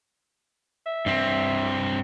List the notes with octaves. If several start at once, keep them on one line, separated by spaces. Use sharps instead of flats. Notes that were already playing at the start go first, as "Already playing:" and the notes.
E5
G2 C4